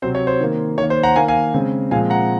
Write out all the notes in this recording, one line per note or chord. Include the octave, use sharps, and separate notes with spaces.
C3 F#3 C4 C5
C#5
C5
D#3 A#3
D#3 A#3 C#5
C5
F#5 A#5
D#3 A#3 F5 G#5
F5 G#5
C#3 G#3 C4
A#2 F3 G#3 C4 F5 G#5
F#5 A#5